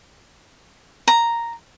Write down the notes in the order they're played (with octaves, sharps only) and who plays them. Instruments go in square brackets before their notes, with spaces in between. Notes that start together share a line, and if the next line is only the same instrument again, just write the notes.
[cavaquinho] A#5